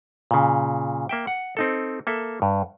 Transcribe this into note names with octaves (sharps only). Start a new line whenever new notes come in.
A#2 C#3
A#3 E5 G5
F#5
C4 D#4 A4
A#3 A4 E5
G2